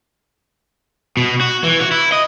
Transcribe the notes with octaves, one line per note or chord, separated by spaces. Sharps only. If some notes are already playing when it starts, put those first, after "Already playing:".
B2
F#4
E3
F#4
E4
D#5